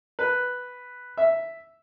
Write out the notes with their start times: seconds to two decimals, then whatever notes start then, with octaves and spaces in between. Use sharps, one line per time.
0.19 B4
1.17 E5